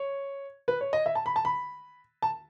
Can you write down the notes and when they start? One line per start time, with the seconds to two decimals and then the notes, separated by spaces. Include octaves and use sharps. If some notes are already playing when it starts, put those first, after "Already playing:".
Already playing: C#5
0.68 B4
0.81 C#5
0.93 D#5
1.06 E5
1.15 A5
1.26 B5
1.36 A5
1.45 B5
2.22 A5